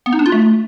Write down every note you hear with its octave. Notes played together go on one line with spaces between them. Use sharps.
B3
D#4
D4
F4
A3